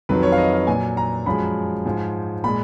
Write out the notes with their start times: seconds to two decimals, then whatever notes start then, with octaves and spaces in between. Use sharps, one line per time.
0.09 F2 D#3 F#3 B4
0.23 C#5
0.32 F5
0.38 D#5
0.53 F5
0.67 A#2 F#3 G#5
0.97 A#5
1.26 F#2 F3 G#3 B5
1.86 G#2 F3 G#3
2.44 A#2 G#3 B5